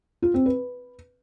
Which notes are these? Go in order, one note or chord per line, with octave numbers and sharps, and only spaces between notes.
F4
C4
B4